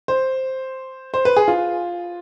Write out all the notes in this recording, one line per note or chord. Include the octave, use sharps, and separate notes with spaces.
C5
C5
B4
G#4
F4